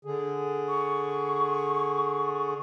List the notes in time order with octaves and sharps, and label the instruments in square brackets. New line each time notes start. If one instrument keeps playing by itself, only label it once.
[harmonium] D3 G#4
[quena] C#6